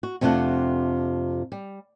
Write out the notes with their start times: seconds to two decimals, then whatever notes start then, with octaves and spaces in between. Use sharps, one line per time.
0.03 F#4
0.21 F2 C3 A3 D4 F4 F#5
1.52 G3